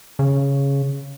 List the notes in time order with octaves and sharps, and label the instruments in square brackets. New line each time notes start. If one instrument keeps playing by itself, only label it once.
[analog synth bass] C#3